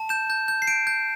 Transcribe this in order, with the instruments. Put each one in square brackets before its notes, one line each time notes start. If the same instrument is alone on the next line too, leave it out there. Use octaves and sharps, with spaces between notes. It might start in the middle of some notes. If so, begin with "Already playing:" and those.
Already playing: [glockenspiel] A5
G6 E7
G6
G6
C7
G6 D7
G6